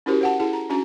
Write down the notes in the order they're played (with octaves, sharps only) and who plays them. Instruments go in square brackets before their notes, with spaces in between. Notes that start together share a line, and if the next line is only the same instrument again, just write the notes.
[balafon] C#4 E4 F#4 G4 A#4 C5
C5 F#5 A5
E4 G#4 A5
A#5
C#4 D4 F#4 A#5